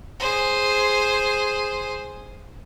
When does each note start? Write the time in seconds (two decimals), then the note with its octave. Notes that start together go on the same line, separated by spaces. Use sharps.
0.20 G#4 C5